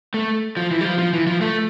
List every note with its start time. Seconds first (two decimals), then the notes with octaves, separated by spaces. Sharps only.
0.14 A3
0.57 F3
0.71 E3
0.81 G3
0.85 F3
0.99 F3
1.13 E3
1.27 F3
1.41 A3